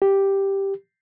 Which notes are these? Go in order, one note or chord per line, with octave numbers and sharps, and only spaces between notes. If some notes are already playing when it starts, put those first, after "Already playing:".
G4